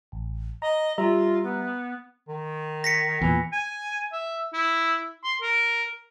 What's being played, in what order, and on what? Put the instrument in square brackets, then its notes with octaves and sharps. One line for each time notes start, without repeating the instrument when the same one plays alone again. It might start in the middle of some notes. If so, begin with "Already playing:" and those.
[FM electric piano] A1
[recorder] D#5 [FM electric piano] A#5
[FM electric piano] G3 E5 A#5 [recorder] F4
[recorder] B3
[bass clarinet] D#3
[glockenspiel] A#6 B6 C#7
[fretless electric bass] E2 A#2 [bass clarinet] E3
[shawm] G#5
E5
E4
C6
A#4